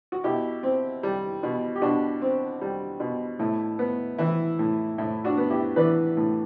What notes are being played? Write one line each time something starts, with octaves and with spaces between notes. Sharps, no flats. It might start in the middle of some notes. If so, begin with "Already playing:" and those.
F#4
B2 E4 G4
C4
G3
B2
G4
B2 D4 F#4
C4
G3
B2
A2 E4
B3
E3 E4
A2
A2 E4
D4 F#4
B3
E4 G4
E3 B4 D5
A2